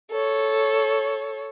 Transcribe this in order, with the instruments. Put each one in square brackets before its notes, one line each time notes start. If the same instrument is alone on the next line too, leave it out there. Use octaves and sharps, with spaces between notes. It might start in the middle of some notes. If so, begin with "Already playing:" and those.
[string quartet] A4 C#5